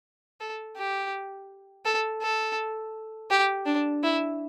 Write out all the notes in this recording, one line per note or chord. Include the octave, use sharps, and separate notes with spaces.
A4
G4
A4
A4
G4
D4
E4